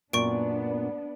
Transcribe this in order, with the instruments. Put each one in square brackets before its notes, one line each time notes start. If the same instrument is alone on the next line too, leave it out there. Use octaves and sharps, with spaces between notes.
[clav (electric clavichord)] F#2 A#2 [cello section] B3 D4 [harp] D5 [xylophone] C#6 D7